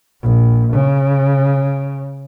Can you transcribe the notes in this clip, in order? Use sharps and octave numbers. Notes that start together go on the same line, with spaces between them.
A#1
C#3